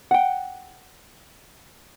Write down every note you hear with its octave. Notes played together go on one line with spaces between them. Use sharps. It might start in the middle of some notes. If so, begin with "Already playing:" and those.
F#5 G5